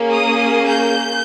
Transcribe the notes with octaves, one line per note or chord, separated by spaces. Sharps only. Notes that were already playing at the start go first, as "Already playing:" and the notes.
Already playing: A#3 C#4 G#4
D#6
G6